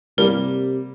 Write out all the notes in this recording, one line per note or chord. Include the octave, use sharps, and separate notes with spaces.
C3 G3 A#3 A#4